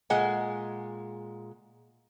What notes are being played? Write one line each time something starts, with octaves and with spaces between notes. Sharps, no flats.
A#2 G#3 F#5 G#5